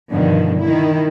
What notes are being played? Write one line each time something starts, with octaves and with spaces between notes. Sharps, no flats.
G2 B2 D3 D#3 F3
D#3 E4